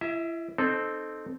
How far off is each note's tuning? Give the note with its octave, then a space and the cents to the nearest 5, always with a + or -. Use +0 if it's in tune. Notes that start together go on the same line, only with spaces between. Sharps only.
E4 +30 E5 -30
C4 +0 D#4 -20 A4 -10